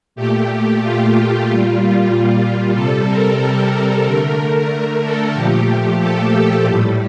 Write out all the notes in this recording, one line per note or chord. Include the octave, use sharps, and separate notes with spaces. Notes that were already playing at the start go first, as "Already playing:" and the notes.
A#2 A3 G4
F4
A#2
G3
C3 G3 A4
A#4
A#4
D3 A3
A#4
A4
A#2 F3 A3 G4
A4
A2 G3